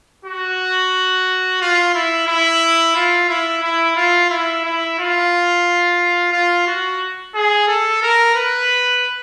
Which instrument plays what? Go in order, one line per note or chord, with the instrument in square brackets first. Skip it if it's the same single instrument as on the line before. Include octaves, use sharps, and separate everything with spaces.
[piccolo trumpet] F#4
F4
E4
E4
F4
E4
E4
F4
E4
E4
F4
F4
F#4
G#4
A4
A#4
B4